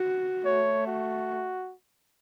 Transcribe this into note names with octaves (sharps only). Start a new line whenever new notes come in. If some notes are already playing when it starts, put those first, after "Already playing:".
Already playing: F#4
A3 C#5
F#4